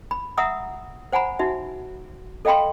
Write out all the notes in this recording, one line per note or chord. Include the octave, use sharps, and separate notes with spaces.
B5
E5 F#5 A#5 D#6 E6
C5 F#5 G#5 A#5 B5
D#4 F#4 E5
A4 D#5 F5 G5 B5 C6